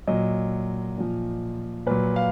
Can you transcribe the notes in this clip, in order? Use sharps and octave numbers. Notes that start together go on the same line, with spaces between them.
A#2 F#3 D#5
A#2 F3
A#2 F#3 B4
F5